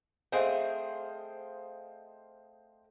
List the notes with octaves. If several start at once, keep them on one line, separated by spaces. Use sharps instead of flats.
A3 C4 G#4 C5 D#5 F5